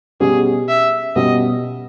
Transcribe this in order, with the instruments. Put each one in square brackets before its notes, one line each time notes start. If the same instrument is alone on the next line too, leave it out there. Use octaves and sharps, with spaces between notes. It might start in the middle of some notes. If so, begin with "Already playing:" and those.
[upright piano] B2 G3 C#4 G4 [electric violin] G#4
[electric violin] E5
[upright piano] B2 G3 C#4 G4 [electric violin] D#5